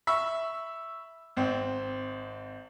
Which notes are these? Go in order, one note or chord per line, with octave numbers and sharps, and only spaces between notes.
E5 B5 C#6 E6
G#1 C4